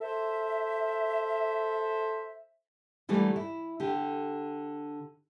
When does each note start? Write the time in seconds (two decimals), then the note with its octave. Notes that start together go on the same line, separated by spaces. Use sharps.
0.01 A4 C5 E5
3.09 D3 E3 G3 A3 A#3
3.36 E4
3.80 D3 G4